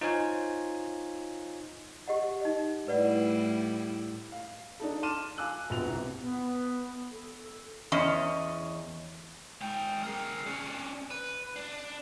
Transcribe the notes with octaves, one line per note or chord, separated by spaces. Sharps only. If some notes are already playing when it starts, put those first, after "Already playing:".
D#4 F4 C5 C#5 F5 G#5
G4 D#5 F#5
D#4 D#5
A2 G3 E4 B4 D5 F#5
F5
D4 D#4 A4
A5 C6 D6 F6 D#7 E7
F5 G#5 D6 E6 F#6
A#1 B2 F#4 F7
C2
B3
A4
E2 C#4 D#5
G#3 G5
G#4 A#4
C#4 D4
B4
D4